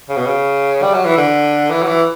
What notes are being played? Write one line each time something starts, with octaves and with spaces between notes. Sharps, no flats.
C#3
B2
C#3
G3
F#3
E3
D3
E3
F#3
E3